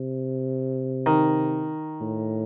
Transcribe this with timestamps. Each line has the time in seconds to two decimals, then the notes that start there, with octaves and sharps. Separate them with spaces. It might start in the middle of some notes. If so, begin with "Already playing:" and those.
Already playing: C3
1.06 D#3
2.01 A2